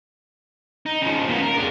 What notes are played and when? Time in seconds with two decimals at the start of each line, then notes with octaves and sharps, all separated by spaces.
0.86 D#4
1.02 C#3 F3
1.28 A#3 B3
1.43 A#4
1.57 G#3 D4